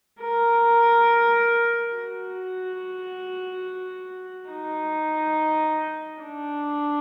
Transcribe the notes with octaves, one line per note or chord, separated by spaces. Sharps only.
A#4
F#4
D#4
D4